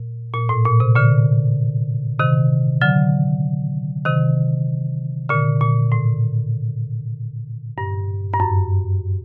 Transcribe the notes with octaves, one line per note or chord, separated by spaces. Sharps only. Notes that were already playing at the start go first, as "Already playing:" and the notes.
Already playing: A#2
A#2
A2
A#2
C3
A#2 D3
C3 D#3
D3 F#3
C3 D#3
A#2 D3
A#2
A2
G2
G2
F#2